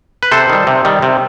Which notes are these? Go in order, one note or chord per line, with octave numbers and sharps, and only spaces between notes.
B4
C3 A4 C5
D#3 G3
C3
D#3 G3
C3